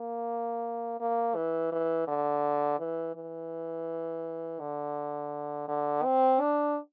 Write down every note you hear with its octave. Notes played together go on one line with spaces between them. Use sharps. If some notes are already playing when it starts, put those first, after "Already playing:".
Already playing: A#3
A#3
E3
E3
D3
E3
E3
D3
D3
C4
D4